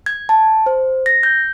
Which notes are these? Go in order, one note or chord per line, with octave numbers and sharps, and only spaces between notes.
G#6
A5
C5
A#6
G6